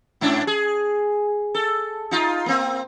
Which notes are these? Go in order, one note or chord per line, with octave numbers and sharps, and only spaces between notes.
G#2 C#4 D4
G#4
A4
D#4 F4
A#3 C4